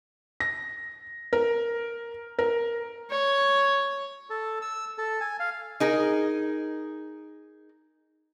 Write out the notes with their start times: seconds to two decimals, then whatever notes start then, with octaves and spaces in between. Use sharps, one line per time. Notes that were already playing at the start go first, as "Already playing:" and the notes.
0.40 A#6
1.33 A#4
2.39 A#4
3.11 C#5
4.30 A4
4.62 E6
4.98 A4
5.21 G#5
5.40 F5
5.80 D#4 G#4 A#4